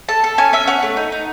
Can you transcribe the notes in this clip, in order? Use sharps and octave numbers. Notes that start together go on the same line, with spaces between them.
A4 A5
A4
C#4 G#5
C#4 E5
C#4 F#5
A3
D#4
D#4